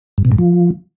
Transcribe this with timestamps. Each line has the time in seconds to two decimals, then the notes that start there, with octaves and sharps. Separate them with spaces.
0.18 G2
0.25 B2
0.32 G#2
0.38 F3